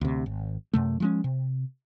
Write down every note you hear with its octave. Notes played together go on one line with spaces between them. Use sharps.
D2 C3
G#1
F#2 C3 A3
F3 G#3 C#4
C3